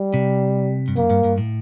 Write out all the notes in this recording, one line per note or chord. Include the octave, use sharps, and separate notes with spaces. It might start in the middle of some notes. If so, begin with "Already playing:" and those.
Already playing: G3
C3
G2
F#2 A#3
G2
G2
A2